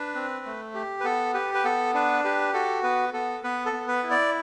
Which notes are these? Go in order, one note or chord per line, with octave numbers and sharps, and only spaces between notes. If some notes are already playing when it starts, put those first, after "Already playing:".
Already playing: D4 B4
C4
A3
G4
B4
B3 A4
G4 B4
B4
B3 A4
D4 B4
G4 B4
F#4 A4
B3 B4
B3 A4
B3 B4
A4
B3
B4
E4
D5